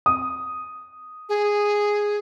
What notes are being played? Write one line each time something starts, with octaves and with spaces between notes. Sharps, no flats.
D#6
G#4